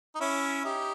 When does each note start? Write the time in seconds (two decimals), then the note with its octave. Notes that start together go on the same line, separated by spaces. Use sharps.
0.15 D#4
0.20 C#4 E4
0.65 D#4 G4